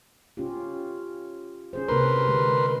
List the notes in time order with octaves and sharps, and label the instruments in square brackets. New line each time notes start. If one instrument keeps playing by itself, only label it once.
[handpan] C#4 F4 G4
C#4 G#4 C5
[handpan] C3 A#3 D4 [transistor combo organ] A#4 B4 C6
[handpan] D3 G#3